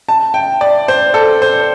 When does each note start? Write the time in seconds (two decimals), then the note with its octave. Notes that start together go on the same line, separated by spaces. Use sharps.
0.09 A5
0.34 G5
0.61 D5
0.88 C5
1.14 A4
1.42 C5